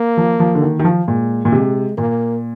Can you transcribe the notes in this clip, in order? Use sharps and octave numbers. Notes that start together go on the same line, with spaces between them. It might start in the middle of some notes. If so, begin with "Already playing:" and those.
Already playing: A#3
F3
F3
D3
D#3
D#3
F3
A#2 G#3
A#2
C3 G#3
A#2 A#3